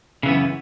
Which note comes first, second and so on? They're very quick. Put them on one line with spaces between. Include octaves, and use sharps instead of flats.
C#3 E3 B3 F#2